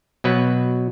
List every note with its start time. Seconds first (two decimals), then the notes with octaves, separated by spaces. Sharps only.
0.24 B2 F#3 B4